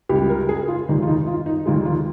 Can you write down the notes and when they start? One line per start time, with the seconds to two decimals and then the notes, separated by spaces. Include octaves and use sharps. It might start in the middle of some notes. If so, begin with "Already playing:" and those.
0.09 C#2 C#3 G3 G4
0.29 A#4
0.49 G#4
0.68 F4
0.88 F1 D#2 D#3 G#3 D#4
1.02 F4
1.08 D#4
1.27 F4
1.46 D#4
1.66 F1 D#2 D#3 G#3 F4
1.85 F4